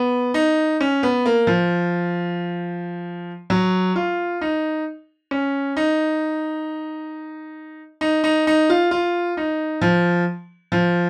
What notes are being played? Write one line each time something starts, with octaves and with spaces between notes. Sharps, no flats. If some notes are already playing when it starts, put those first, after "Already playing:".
Already playing: B3
D#4
C#4
B3
A#3
F3
F#3
F4
D#4
C#4
D#4
D#4
D#4
D#4
F4
F4
D#4
F3
F3